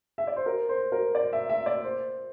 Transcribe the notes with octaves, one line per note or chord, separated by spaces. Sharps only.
E5
D5
C5
A#4
C5
A#4
D5
E5
E5
D5
C5